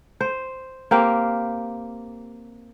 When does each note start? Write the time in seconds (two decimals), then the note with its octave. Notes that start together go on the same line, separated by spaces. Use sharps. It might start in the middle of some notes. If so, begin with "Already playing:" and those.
0.21 C5
0.91 A#3 C4 G4 F5